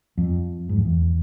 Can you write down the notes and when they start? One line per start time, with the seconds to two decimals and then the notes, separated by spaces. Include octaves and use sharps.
0.17 F2
0.69 G#2
0.77 F2
0.84 E2